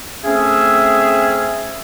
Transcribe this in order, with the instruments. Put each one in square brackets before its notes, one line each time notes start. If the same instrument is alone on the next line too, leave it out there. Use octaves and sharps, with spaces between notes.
[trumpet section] A3 E5 [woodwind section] C4 C#4 G#4